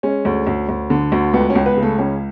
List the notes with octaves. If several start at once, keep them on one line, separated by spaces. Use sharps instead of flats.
G#3 C#4
D2
D2
D2
D3
D2
C#2 B3
C#4
C#2
B3 B4
C#3
A3 A4
C#2 C#4